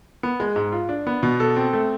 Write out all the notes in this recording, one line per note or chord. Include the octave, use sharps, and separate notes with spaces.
B3
G#3
G#2
F4
D4
B3
B2
A4
C4
A3